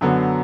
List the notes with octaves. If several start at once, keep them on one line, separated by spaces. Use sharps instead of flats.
F#2 D3 F#3 B3